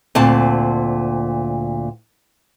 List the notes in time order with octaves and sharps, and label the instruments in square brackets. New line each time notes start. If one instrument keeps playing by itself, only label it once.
[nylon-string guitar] D2 A#2 C4 A5